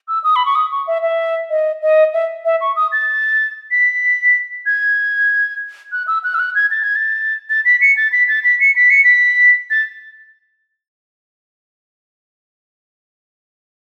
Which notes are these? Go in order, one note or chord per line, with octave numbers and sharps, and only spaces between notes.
E6
D#6
B5
C#6
D#6
C#6
E5
E5
D#5
D#5
E5
E5
C#6
D#6
A6
B6
G#6
F#6
E6
F#6
E6
F#6
G#6
A6
G#6
A6
A6
B6
C#7
A6
B6
A6
B6
C#7
B6
C#7
B6
A6